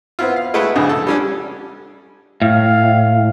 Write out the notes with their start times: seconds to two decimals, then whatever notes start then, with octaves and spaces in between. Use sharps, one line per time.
0.19 B3 C4 E4 F4
0.36 F5
0.54 G#3 A3 E4 F#4 B4 F#5
0.76 A#1 G#2 C#3
0.89 A4
1.07 G3 C#4 D4
2.42 A2 F5